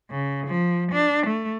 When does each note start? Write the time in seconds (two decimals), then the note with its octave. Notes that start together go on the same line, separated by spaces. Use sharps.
0.11 C#3
0.47 F3
0.92 D4
1.26 A3